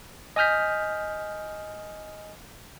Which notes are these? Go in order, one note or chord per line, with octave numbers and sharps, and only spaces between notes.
D#5 G#5 D#6 F6 G6 B6